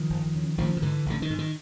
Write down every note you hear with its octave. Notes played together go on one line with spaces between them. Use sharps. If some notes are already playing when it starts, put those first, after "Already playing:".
Already playing: D#3 F3
F#1
E2 C#3
A1 D#3 F3
D#3
G#2 D3 E3
A1 D3
D#3
G#2
D#3